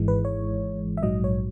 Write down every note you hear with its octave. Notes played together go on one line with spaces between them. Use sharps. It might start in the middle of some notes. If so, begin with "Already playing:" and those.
Already playing: G#1 G#2 E3 G#3
B4
C#5
E5
A#1 G#2 F#3 D#5
C#5